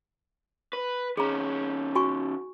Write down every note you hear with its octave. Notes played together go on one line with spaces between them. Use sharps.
B4
D#3 C#4 G#4 A#5
F#4 G#5 C#6